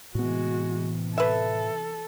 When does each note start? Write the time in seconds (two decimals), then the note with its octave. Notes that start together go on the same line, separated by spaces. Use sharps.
0.15 A2 C3 E3 G#3 B3 F#4
1.18 A4 B4 E5